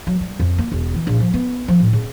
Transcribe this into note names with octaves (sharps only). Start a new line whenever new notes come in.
F#3
G3
F2
A#3
E1
E3
A#1
F3
B3
F3
A2
C#3